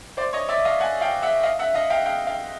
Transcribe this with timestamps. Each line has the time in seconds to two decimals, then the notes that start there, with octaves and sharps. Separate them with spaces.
0.17 C5 D5
0.33 C#5 D#5
0.49 D5 E5
0.65 D#5 F5
0.80 F#5 G#5
1.01 F5 G5
1.22 E5 F#5
1.43 D#5 F5
1.59 E5 F#5
1.74 D#5 F5
1.90 F5 G5
2.06 F5 G5
2.27 F5 G5